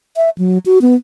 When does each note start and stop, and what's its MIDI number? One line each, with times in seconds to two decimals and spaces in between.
0.16 0.30 76
0.38 0.58 54
0.66 0.79 66
0.82 0.95 59